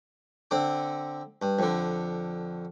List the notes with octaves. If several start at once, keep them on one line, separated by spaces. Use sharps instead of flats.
D3 C4 D6
G2
F2 D3